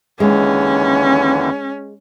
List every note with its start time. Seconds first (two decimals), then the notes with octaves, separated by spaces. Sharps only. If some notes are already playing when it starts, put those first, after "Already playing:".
0.20 D#2 D3 E3 G#3 C#4